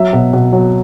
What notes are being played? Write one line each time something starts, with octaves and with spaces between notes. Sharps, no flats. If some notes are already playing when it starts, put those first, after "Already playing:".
Already playing: F#3 E5
B2
B2
F#3